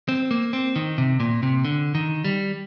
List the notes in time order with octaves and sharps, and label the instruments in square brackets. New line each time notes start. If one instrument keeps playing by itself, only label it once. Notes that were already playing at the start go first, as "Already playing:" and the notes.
[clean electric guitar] C4
A#3
C4
D#3
C3
A#2
C3
D3
D#3
G3